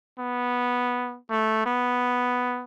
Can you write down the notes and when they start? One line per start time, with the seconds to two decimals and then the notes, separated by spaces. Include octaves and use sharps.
0.19 B3
1.30 A3
1.66 B3